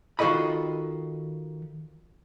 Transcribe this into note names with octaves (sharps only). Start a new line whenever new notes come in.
D#3 F4 F#4 A4 D#5 B5